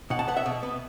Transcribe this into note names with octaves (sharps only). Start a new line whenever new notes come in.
B2 F#5
A5
B3 F#5
E5
B2
B3